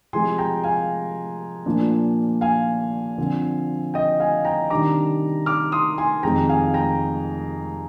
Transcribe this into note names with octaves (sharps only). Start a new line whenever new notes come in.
C3 F3 G#3 G#5 C6
G5 A#5
F5 G#5
A#2 F3 A#3 D4
F5 G#5
D3 F3 C4
D#5 G5
F5 G#5
G5 A#5
C3 D#3 G3 D4 A#5 D6
D6 F6
C6 D#6
G#5 C6
F2 C3 D#3 G#3 G5 A#5
F5 G#5
G5 A#5